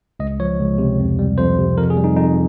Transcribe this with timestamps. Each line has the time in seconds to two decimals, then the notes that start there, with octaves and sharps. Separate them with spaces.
0.20 C#2 D#5
0.40 F3 C#5
0.59 C#2
0.78 C3
0.99 F2
1.19 G3
1.38 F2 C5
1.58 C3
1.78 F2 A#4
1.90 G#4
1.97 G3
2.04 D#4
2.16 F2 D#4